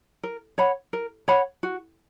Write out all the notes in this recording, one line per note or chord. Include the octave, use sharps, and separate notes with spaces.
A#4
C#5 F#5 B5
A#4
C#5 F#5 B5
F#4